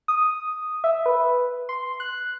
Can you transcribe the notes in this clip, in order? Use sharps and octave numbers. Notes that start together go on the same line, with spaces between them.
D#6
E5
B4
C6
F#6